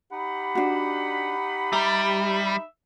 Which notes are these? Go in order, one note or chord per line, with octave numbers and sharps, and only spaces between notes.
D#4 G4 F#5 B5
D4 F#4
G3 E5 A#5